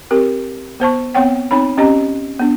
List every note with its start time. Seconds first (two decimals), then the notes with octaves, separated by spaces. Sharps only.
0.11 C4 G4 A#4
0.80 B3 C5 A5 C#6
1.15 B3 C4 C#5 F#5 G5
1.51 C4 D#4 C#5 B5
1.77 C4 C#4 G4 D#5 A#5
2.39 B3 D4